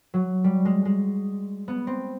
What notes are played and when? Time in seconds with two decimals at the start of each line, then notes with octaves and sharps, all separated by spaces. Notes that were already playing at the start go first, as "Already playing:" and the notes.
0.14 F#3
0.44 G3
0.65 G#3
0.85 G#3
1.68 B3
1.87 C4